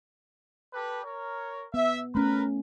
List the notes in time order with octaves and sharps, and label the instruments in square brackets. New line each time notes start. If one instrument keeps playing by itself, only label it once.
[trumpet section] G4 A4 B4
A#4 C#5
[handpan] B3 [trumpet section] E5
[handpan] A3 C#4 [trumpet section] A#4 B4